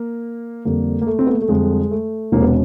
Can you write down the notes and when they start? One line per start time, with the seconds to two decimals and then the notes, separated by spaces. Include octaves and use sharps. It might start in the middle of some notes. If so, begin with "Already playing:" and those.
Already playing: A#3
0.65 F2 D3 G3 A#3
1.02 A#3
1.07 A3
1.19 C4
1.27 B3
1.35 A#3
1.41 A3
1.48 F2 D3 G3 G#3
1.91 A3
2.32 E1 E2 C3 A#3
2.42 B3